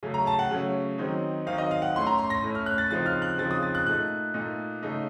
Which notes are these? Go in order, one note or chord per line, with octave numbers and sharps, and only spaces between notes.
C#3 F#3 A3 C#4
A#5
A5
F#5
C#3 F#3 A3 C#4
D#3 F#3 C4 D#4
D#3 F#3 C4 D#4 F5
D#5
F5
F#5
A2 A3 C#4 C6
A#5
C6
A#6
A2 A3 C#4
F6
F#6
A6
C#3 F3 C4 D#4 A6
F6
F#6
C#3 F3 C4 D#4 A6
D#6
A6
F#6
A#2 A3 D#4 F#6
A#2 A3 D#4
C#3 A3 D#4